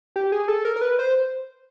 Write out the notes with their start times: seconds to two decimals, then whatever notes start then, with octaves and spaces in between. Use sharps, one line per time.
0.16 G4
0.32 G#4
0.48 A4
0.65 A#4
0.76 A#4
0.81 B4
0.99 C5